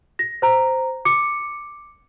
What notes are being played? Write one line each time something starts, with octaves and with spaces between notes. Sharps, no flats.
A#6
C5 A#5
D6 C#7